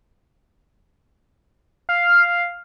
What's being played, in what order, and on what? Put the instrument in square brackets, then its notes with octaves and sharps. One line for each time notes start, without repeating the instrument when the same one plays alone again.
[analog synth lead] F5